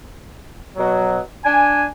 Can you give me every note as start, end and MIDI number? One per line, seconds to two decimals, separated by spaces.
0.77 1.19 47
0.77 1.19 54
1.44 1.85 62
1.44 1.85 80